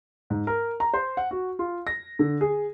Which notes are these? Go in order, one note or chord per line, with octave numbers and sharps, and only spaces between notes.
G#2
A#4
A#5
C5
F#5
F#4
F4
A#6
D3
G#4